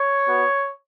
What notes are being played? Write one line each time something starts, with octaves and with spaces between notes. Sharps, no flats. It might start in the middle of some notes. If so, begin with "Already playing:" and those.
Already playing: C#5
B3 F#4